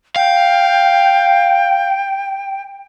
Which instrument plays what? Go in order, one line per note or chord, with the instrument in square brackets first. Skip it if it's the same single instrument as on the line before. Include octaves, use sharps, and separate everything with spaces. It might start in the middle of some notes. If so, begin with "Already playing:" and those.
[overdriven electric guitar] F5 [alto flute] G5